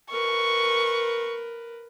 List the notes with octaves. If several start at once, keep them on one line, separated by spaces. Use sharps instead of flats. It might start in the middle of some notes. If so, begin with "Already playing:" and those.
A#4 B4 C#6